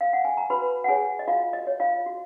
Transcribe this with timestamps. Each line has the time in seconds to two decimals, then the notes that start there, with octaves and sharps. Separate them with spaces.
0.01 F5
0.13 F#5
0.25 G#5
0.37 A#5
0.50 F#4 B4 B5
0.84 F#5
0.88 G#4 C#5 G#5
1.19 D#5
1.28 F4 F#4 F5
1.53 D#5
1.67 C#5
1.80 F4 F5
2.06 F#4